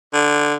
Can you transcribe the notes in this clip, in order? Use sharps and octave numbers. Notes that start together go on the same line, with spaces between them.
D3